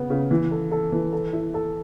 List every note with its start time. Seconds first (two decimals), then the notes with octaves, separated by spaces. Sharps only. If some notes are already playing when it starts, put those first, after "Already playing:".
Already playing: C#3 B3
0.10 C#3
0.31 E3
0.51 A4
0.72 A4
0.92 E3
1.13 A4
1.33 E4
1.54 A4